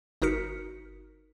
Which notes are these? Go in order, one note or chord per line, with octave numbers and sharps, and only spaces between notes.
G1 D#4 F#4 A#4 B6 C#7